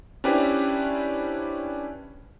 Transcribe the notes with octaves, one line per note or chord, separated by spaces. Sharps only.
C#4 D4 E4 G4 B4 C5